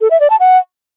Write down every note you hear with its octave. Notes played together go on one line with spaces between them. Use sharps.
A4
E5
D5
A5
F#5